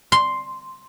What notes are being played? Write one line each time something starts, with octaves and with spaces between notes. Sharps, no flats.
C6